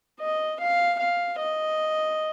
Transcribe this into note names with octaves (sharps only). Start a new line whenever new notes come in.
D#5
F5
F5
D#5